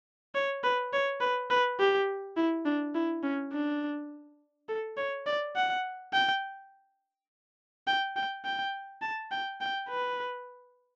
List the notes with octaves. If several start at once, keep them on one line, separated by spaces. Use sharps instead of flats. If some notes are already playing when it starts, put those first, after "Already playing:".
C#5
B4
C#5
B4
B4
G4
E4
D4
E4
C#4
D4
A4
C#5
D5
F#5
G5
G5
G5
G5
A5
G5
G5
B4